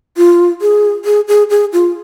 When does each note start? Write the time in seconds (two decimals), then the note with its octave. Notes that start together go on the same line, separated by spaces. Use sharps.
0.17 F4
0.61 G#4
1.05 G#4
1.28 G#4
1.50 G#4
1.73 F4